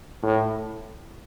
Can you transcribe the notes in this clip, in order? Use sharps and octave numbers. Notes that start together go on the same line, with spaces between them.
A2